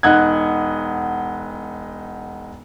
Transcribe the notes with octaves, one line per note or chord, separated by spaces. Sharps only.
E1 D#4 F#5 F#6 G#6